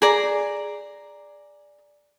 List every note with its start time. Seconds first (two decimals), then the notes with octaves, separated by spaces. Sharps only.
0.02 G#4 D5 A#5